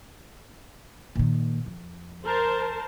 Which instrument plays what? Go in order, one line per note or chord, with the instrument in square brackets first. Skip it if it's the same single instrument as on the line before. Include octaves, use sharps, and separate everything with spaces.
[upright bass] A#2 D#3
F2
[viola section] A#4 C5 A5